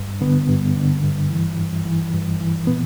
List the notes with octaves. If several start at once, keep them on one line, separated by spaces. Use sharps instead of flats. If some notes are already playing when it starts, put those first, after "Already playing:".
Already playing: G2
D3 B3
G2
D3
G2
E3
G2
E3
G2
E3
A#2 B3